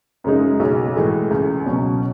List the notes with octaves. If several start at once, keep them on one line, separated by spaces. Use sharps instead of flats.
F#2 C#3 G#3 D#4
B1
A2 E3 G#3
C#2
B2 F#3 C#4